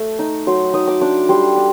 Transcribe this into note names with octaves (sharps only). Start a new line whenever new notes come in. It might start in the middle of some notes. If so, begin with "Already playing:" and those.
Already playing: A3
D#4
F#3 C6
D#4 D#6
D6
D4 D6
G3 C6
D4